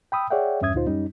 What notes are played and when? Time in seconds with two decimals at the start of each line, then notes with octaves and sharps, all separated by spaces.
0.12 G5 B5 D#6 E6
0.30 G#4 C#5 D5 E5 F#5 G5
0.61 E2 G2 C#4 E5 D#6 G#6
0.74 D2 A#2 D#4 F4 C5
0.87 F#2 G3 C#4 D#4